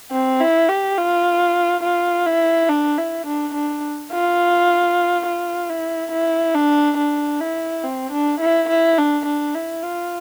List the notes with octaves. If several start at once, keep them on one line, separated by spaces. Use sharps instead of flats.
C4
E4
G4
F4
F4
E4
D4
E4
D4
D4
F4
F4
E4
E4
D4
D4
E4
C4
D4
E4
E4
D4
D4
E4
F4